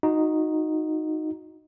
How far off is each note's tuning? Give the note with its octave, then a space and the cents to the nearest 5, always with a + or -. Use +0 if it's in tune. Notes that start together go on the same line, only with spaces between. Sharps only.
D#4 +0 F#4 -20